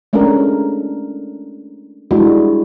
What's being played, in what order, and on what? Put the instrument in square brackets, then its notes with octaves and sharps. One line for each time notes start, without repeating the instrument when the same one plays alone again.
[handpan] G#3 A3 C#4 D4 A4 A#4
G3 G#3 D4 E4 F#4